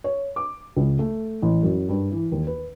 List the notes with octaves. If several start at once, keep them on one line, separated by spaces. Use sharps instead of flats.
C#5
D6
C#2
A3
A1
F#2
G2
E3
D#2
B4